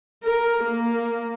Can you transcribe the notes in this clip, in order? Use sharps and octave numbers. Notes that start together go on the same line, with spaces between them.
A#4
A#3